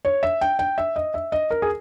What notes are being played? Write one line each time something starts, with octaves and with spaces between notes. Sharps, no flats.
C#5
E5
G5
G5
E5
D#5
E5
D#5
A#4
G#4